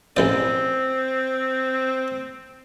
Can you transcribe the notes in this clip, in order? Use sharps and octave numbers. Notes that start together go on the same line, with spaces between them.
A1 E3 C4 D5